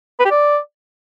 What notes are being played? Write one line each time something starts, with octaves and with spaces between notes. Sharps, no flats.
B4
G4
D5